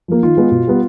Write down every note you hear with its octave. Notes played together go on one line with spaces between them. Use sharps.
F3 A#3
D#3 F4
G#3 B3
B2
G3 B3